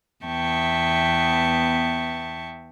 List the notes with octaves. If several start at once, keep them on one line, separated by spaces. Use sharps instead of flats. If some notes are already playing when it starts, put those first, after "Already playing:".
E2 B3 E5 G5 A5 C#6